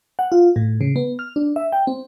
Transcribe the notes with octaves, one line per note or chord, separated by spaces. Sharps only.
F#5
F4
A2
C#3
B3
F6
D4
E5
G5
C4